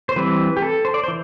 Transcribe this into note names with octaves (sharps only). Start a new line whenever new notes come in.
C5
E3 G3 C4 B4
G4
A4
C5
D5
E3 C5